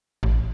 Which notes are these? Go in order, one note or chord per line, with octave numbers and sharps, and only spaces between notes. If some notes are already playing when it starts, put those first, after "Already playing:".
A1